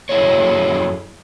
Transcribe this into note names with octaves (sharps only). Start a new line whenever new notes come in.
F#2 F#3 E4 G#4 A4 C#5